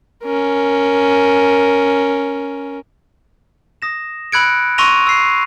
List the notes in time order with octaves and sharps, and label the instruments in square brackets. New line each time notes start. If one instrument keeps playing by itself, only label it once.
[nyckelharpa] C#4 A#4
[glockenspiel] D#6 A#6 E7
B5 E6 F#6 G#6 C#7 D7
C6 C#6 E6 A#6 D#7 F7
E6 C7